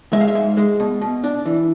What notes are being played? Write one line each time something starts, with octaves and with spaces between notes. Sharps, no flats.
G#3 E5
F5
E5
G#2
G#3
B2
B2
D4
E3